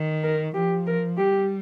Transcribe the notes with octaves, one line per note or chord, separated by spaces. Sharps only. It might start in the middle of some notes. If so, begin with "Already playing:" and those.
Already playing: D#3
A#4
F3 G4
A#4
G3 G4